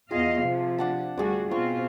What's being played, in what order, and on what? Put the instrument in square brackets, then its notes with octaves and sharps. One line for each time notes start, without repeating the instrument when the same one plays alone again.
[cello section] E2 D#5 F5 [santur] F4 G#4
[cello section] C3 F3
[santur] D4 F#5 A5
[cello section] D2 G3 F#4 [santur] G#4 D5
[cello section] B2 C4 F4 [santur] C#6